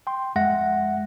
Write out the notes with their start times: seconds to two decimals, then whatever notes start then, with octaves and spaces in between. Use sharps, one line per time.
0.07 G5 C6
0.36 F2 G#3 E5 F#5 A#6